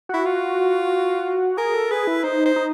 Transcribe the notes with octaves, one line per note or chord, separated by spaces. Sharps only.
E4 F#4
F4
G#4 A#4
A4
G#4 B4
E4
D#4 C5
C5
D#4